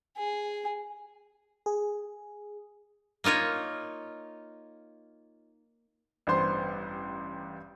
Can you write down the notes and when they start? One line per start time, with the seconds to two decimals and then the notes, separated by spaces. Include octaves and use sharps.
0.17 G#4
1.66 G#4
3.24 A#3 D#4 F4 C#5 D#5
6.27 A1 G2 B3 C5 C6